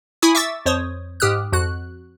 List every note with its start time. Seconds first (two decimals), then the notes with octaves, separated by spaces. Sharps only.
0.22 E4 G#5 B5 C#6 D#6
0.35 E5 C#6 D6 E6 A6
0.66 F2 C5 C#5 D#6
1.20 G#2 G4 D#6 F6 F#6
1.52 F2 F#4 F#6